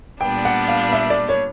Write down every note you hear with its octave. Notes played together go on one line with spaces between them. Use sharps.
A#2 G3 B3 D4 G5
F#5
F5
E5
D5
C#5